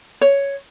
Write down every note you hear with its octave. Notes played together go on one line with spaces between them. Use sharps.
C#5